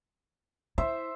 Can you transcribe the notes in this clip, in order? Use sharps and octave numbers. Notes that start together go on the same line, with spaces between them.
E4 C5 E5